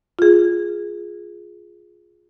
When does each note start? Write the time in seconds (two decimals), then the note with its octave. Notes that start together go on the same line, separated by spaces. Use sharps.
0.19 F4 G#4